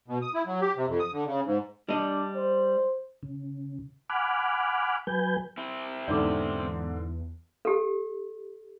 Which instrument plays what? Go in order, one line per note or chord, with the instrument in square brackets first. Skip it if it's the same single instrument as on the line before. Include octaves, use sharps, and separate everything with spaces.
[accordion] B2
D#6
E4
F#3
G4
C3
F2
D#6
D3
C#3
G#2
[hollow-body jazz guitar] G3 D#5 [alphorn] D4
[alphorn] C5
[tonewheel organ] C#3
F#5 G#5 B5 D6 F6 F#6
F#3 B4 G#5 G6
[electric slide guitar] C4 E4
[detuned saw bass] E2 [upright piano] G#2 D3 [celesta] D5 D6
[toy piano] G4 A4